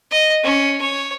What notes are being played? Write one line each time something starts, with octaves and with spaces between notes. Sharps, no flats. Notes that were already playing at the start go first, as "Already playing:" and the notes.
D#5
C#4
C#5